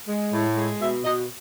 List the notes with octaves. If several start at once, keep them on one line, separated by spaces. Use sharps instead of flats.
G#3
A2
G#3
B2 E5
B2 D#5